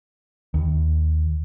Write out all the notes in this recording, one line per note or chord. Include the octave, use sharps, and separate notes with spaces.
D#2